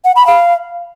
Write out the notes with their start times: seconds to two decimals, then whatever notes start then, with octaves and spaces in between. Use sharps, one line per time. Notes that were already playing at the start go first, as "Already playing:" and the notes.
0.05 F#5
0.16 B5
0.27 F5